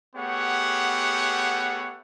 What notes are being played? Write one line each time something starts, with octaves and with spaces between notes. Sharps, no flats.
A3 B3 G4 G#4 C#5 F#5